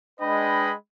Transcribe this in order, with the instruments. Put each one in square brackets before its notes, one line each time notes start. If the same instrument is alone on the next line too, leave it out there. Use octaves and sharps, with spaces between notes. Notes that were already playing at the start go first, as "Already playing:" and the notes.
[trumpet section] G#3 D4 B4 D#5 G5 B5